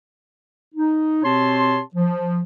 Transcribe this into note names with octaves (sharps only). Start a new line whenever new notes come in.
D#4
B2 C4 G4 C#5 A5 C6
F3